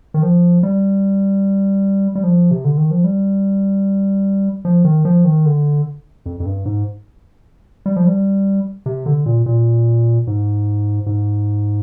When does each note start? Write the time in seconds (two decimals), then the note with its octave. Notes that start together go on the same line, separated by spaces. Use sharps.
0.14 D#3
0.22 F3
0.63 G3
2.15 G3
2.23 F3
2.51 C3
2.64 D3
2.77 D#3
2.91 F3
3.04 G3
4.65 F3
4.84 D#3
5.05 F3
5.25 D#3
5.45 D3
6.26 F2
6.40 F2
6.46 G2
6.65 G#2
7.86 G3
7.96 F3
8.07 G3
8.86 C3
9.06 D3
9.26 A#2
9.46 A#2
10.27 G#2
11.06 G#2